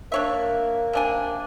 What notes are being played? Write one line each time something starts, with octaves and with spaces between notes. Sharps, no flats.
A#3 D4 C#5 E5
C3 D4 G#5